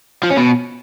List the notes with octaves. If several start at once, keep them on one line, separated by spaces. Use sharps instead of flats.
F3
C#4
B2